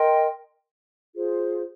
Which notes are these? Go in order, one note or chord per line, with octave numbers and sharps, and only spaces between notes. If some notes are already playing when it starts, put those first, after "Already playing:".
Already playing: A#4 D#5 G5 C6
F4 G#4 C5